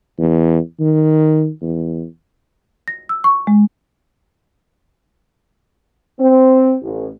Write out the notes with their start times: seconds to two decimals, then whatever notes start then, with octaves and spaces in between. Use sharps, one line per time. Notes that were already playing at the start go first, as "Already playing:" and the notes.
0.19 E2
0.80 D#3
1.62 E2
2.88 A#6
3.09 E6
3.24 C#6
3.47 G#3
6.19 C4
6.82 A1